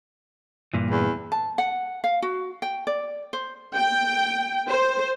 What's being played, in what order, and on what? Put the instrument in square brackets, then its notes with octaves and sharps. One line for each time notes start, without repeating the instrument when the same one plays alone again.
[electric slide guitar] G2 A#2 E3
[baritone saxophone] E2
[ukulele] A5
F#5
F5
F#4
G5
D5
C5
[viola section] G5
C5